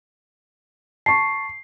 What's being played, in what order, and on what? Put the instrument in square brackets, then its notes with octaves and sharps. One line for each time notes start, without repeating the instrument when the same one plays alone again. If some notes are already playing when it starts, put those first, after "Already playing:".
[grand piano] A5 C#6 [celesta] C7